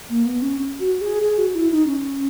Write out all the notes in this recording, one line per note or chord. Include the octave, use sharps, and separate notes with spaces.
A#3
B3
C#4
F#4
G#4
G#4
F#4
E4
D#4
C#4